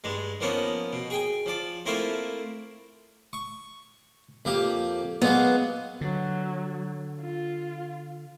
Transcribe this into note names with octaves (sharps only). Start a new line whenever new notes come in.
G2 G#3
F3 A#3 B3 C#4 D#4
B2
G#4 G5 G#5
F3 D5
A3 A#3 C4 E4 F4 E5
C#6
F2 A#3 G4
F#3 G#3 A#3 B3
D3 F#3
F4